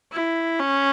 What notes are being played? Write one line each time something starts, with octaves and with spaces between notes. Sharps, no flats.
E4
C#4